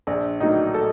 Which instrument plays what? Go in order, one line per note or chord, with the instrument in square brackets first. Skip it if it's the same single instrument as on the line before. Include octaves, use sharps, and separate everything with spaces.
[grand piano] A#1 [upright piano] D4
[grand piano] A2 F#3 A#3 [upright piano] D#4
[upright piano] A4